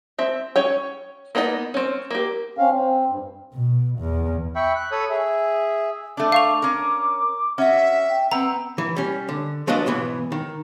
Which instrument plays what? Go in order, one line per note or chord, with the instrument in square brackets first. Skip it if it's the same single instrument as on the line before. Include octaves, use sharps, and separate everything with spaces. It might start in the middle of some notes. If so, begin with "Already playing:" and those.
[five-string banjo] C4 E5
C#4 C#5 G5
A#3 B3 D#4 A#4 D#5
C4 C#4
A#3 G4
[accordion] C4 C#4 F5
C4
G2
[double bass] B2
E2
[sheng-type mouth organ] E5 G5 B5 C#6
F#6
A4 C#5 B5 D#6
G#4 E5
[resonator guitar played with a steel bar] A3 D4 [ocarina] D6
[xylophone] F5 C#6 F7
[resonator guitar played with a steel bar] C#4 A#4
[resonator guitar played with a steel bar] C#4 F#4 [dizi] E5 [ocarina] F#5
[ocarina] G5
[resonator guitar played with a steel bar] B3 C4 [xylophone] A#5 [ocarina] E6
[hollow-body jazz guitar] E3
G3 C#4
D3
F3 F#3 B3 D4 F4 D#5
B1 G#2 E3 B3
D#3